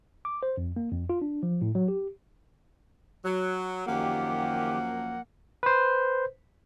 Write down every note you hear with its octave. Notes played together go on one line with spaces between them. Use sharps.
D6
C5
F2
A#3
F2
F4
D4
F3
A2
F#3
G4
F#3
F#2 D#3 F3 A#3 G4 F#5
B4 C5